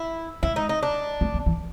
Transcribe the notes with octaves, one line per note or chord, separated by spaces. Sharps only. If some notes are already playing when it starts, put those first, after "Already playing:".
Already playing: E4
G#3 E4
D#4
D#4
D4
A3
A#3
E3